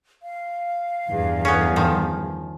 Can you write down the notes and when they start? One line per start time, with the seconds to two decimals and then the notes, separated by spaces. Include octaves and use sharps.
0.23 F5
1.08 E2 G2
1.45 B3 C#4
1.76 D#3 F3